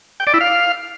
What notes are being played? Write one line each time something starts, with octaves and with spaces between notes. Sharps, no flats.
G5
D5
E4
F5